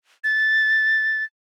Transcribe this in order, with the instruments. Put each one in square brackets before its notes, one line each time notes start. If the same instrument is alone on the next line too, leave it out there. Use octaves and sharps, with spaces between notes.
[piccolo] A6